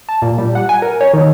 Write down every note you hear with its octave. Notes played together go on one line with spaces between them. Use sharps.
A5
A#2
G3
F#5
G#5
A#4
C#5
D#3